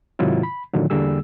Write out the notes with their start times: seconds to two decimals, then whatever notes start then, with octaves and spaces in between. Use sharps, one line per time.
0.19 G#2 C3 D#3 F#3 E4 F4
0.43 B5
0.73 A2 D3 D#3 F3 F#3
0.90 E2 D3 G3 A#3 G#4 E6